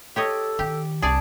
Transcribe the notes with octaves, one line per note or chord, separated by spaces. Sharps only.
G4 A4 C#5 D#5
D#3 G4
C2 G#4 D5 A5